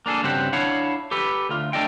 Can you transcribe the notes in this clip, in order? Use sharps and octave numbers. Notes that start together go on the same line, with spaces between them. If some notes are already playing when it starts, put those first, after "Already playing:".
A#3 D4 G#4 A4
G2 C#3 C4 F#4 G4 F#5
D4 E4 C#5 F5 F#5
G4 A4 B4
D2 F4
A3 D4 A4 D5 D#5 G5